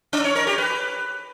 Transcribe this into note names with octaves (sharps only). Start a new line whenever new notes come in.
C#4
C#5
A#4
G4
B4